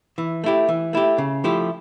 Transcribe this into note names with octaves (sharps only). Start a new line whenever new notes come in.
E3
A3 E4 G4
E3
A3 E4 G4
C#3
F3 A3 E4 G4